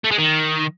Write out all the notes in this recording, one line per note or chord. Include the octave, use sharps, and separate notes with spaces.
A3
G#3
D#3